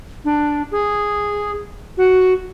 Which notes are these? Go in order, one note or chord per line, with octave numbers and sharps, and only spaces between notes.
D4
G#4
F#4